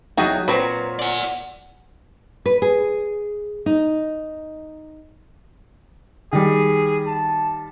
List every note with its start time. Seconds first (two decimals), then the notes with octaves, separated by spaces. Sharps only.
0.17 E2 F#3 D#4 F#4 G#4 G5
0.48 A#2 F#3 C4 B4 C#5 B5
0.99 D5 F#5 G#5
2.46 B4
2.62 G#4
3.66 D#4
6.33 D#3 G3 G#4
7.07 A5